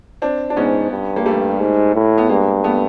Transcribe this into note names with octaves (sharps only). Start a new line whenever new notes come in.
C4 D4
D4
G#2 B3 C#4
G2
A#3
G3 A3
G#2
A2
B3
G2 G#3 A#3
A3 B3